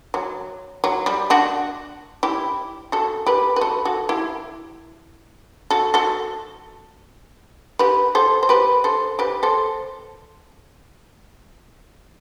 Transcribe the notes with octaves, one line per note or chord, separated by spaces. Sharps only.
F#3
F#3
G3
D4 F#4
E4 G4
F#4 A4
G4 B4
B4
F#4 A4
F#4 A4
E4 G4
F#4 A4
F#4 A4
G4 B4
A4 C5
C5
G4 B4
A4 C5
G4 B4
A4 C5